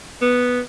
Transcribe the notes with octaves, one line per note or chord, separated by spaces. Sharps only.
B3